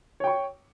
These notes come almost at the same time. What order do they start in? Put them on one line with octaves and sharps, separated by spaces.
C#5 G5 C#6